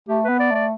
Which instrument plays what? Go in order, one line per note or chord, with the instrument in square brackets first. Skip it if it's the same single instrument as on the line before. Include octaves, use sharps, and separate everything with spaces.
[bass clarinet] A3 [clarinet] G4
[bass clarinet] B3 [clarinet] B4
[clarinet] D5
[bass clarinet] A3 [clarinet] D5